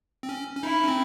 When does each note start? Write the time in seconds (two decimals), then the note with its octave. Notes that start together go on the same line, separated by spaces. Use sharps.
0.23 C4
0.29 C#4
0.57 C#4
0.63 D#4 E4
0.84 C#4
0.88 C4